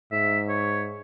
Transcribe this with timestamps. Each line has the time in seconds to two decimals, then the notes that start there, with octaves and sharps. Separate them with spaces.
0.12 G#2 E5
0.49 C#5